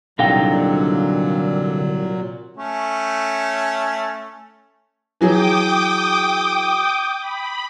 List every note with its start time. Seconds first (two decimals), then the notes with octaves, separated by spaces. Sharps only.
0.19 C2 A#2 D3 D#3 F#3 F5 G5 A#5
2.55 A3 C#4
5.21 E3 F#3 G#4 G5 D6 D#6
7.20 B5